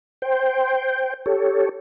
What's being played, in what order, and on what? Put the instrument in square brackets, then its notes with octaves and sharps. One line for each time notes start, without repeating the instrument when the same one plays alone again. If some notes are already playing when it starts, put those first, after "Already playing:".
[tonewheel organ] C5 G5
G4 A4 C#5